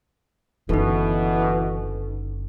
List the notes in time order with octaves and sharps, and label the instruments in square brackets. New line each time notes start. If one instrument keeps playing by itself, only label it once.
[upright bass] F#1 D3 [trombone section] B2 [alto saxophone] E3 [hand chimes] D#4 A4